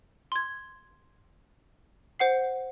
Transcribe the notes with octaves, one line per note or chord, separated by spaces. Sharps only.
C6 G#6
C5 F#5 C7